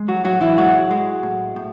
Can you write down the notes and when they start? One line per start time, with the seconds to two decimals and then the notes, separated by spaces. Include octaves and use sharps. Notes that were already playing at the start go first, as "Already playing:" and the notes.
Already playing: G#3
0.08 F#3 F#4
0.24 A2 F#3 F#4
0.41 E3 E4
0.57 F#3 G#3 F#4
0.91 G#3
1.23 A2
1.56 A2